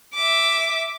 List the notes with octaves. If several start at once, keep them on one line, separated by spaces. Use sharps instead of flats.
E5 D6